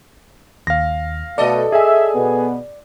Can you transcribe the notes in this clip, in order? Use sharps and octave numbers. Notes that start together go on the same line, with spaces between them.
D#2 F5 A#6
B2 A3 A4 D5 D#5
G#4 E5 G#5
B2 B3